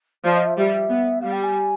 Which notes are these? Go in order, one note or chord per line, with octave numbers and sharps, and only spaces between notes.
F3 D5
D#5
E5
G3 E5
B3
G3 F5
G5
G#5